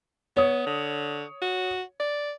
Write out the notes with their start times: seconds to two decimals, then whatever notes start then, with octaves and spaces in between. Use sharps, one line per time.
0.37 B3 C#5 D#6
0.66 D3
1.42 F#4
2.00 D5